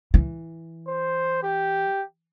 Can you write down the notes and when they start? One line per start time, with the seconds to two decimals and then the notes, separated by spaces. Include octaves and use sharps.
0.14 E3
0.88 C5
1.43 G4